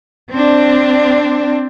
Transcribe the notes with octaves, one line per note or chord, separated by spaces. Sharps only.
C4 D4